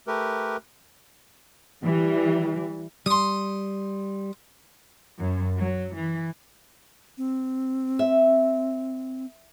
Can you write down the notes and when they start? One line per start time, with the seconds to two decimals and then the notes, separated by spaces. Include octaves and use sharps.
0.07 A3 G4 A#4 B4
1.83 E3 G3
3.06 G3 C6 D#6
5.18 F#2
5.59 F#3
5.96 E3
7.18 C4
7.99 E5